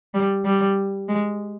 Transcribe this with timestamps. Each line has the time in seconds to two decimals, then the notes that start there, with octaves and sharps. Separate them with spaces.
0.14 G3
0.45 G3
1.09 G#3